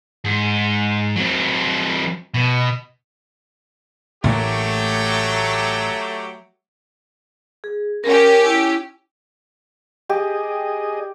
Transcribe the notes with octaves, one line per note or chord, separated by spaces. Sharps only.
G#2
F#3 C4
B2
A1 A2 F#3 A3 A#3 G4
G#4
C#4 G4 A#4
E4
G4 G#4 D#5